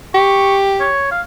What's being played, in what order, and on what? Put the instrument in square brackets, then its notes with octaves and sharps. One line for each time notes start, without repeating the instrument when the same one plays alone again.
[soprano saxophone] G4 [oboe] C#6
[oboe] C#5
F5